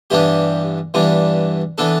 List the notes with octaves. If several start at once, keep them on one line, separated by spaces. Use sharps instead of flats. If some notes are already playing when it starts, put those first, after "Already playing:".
G2 E3 B3 D4 G4
G2 E3 B3 D4
E3 B3 D4 A4